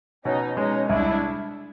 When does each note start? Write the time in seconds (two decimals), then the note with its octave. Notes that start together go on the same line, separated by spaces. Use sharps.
0.25 B2 C#4 D#4
0.57 G#3 C#4 D#4
0.89 C2 D4 E4